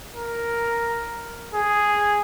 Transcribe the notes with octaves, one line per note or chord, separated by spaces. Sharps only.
A#4
G#4